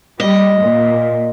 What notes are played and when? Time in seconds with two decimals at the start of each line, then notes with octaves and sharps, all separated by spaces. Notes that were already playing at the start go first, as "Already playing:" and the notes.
0.20 G3 D#5
0.60 A#2